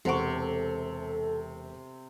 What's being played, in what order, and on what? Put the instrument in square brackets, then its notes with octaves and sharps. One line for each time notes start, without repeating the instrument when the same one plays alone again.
[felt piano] E1 F#5 C#6 [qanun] C3 D6 [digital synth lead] A4